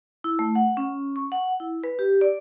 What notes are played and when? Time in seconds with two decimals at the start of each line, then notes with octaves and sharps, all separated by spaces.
0.24 E4
0.39 A3
0.55 F#5
0.77 C#4
1.16 C#6
1.32 F#5
1.60 E4
1.84 B4
1.99 G4
2.21 D5